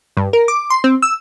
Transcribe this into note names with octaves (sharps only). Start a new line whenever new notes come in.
G2
A#4
D6
C6
C4
E6